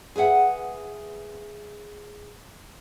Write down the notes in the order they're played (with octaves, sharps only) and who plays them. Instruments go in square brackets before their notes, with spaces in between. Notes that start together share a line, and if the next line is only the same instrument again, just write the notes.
[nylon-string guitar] G#4 B4 E5 F#5